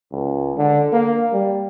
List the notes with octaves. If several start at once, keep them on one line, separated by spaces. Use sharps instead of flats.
C#2
D3
A#3
G3